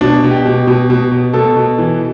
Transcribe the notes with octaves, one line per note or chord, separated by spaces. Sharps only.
B2 D4
B2
G4
B2
B2
B2
B2
B2 A4
B2
E3